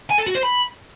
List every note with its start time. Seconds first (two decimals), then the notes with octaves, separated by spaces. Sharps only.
0.10 G#5
0.18 A4
0.27 F#4
0.35 C5
0.43 B5